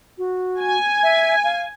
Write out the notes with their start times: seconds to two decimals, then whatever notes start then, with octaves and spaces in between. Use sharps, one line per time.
0.18 F#4
0.61 G#5
1.03 E5
1.44 F5